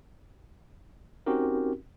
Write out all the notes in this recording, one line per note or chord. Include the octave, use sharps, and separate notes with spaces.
C4 C#4 D#4 F#4 G4 A#4